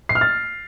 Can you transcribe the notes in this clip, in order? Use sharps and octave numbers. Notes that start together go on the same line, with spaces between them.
C7
F6
A6